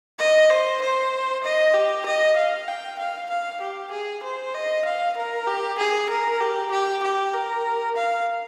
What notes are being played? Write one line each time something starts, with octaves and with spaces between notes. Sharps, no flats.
D#5
C5
C5
D#5
G4
D#5
F5
G5
F5
F5
G4
G#4
C5
D#5
F5
A#4
G4
G#4
A#4
G4
G4
G4
A#4
F5